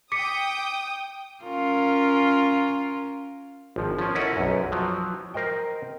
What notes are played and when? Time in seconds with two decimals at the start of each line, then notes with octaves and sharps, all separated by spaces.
0.12 G5 D6 D#6 B6 C#7
1.44 C#4 F4 A#4
3.76 G#1 F3
3.99 F3 C#4
4.15 C#4 E4 A4 A#4 D#5 F#5
4.36 B1 F#2
4.72 F3 F#3
5.34 A#4 C5 D#5 G5